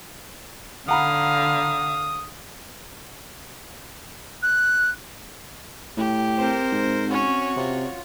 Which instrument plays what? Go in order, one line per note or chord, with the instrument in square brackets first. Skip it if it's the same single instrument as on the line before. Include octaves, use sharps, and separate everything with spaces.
[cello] D3 [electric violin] F5 [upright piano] F#5 A#5 B5 [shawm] D#6
[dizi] F#6
[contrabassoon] A2 [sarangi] G4
[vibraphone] C4 [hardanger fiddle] A#4 C5
[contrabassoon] G#2
[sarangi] C#4 [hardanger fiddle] F#4 C#5
[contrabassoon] C3 [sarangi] F4